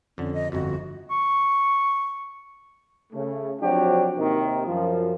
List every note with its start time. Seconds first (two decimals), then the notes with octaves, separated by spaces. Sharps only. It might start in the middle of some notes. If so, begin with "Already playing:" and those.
0.18 F2 D3 C#4
0.34 D#5
0.52 G1 F2 F#4
1.11 C#6
3.13 C#3 A3
3.61 F3 F#3 C4 D4 F#4 G4
4.17 D#2 C3 D#3
4.66 F#2 F3